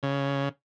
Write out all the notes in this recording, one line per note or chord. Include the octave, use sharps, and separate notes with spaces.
C#3